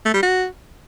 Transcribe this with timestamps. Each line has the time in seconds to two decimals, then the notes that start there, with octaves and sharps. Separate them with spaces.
0.05 A3
0.14 G3
0.22 F#4